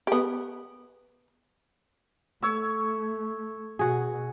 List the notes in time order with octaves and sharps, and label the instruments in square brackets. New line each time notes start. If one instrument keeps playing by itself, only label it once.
[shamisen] B3 G4
[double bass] A3 [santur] C#5 E6
[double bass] B2 [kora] F#4 G#4